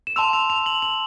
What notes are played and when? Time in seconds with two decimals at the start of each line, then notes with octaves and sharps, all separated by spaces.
0.07 E7
0.16 A5 C6 E6 F7
0.33 F7
0.50 F7
0.66 F#7
0.82 F#7